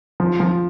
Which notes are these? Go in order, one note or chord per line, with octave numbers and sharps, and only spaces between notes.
F3
F3